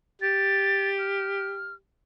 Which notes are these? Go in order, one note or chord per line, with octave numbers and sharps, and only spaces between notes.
G4 A6
F6